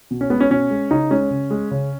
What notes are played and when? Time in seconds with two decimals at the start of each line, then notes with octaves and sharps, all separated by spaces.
0.11 B2
0.21 C#4
0.30 G#3 B3
0.40 C#4
0.50 B2 C#4
0.71 G#3
0.91 C#3 D#4
1.10 G#3 C#4
1.31 C#3
1.50 G#3
1.71 C#3